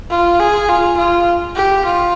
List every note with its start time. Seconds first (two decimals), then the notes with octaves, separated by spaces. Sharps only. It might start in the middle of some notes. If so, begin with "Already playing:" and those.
0.11 F4
0.40 G#4
0.69 F4
0.97 F4
1.55 G4
1.85 F4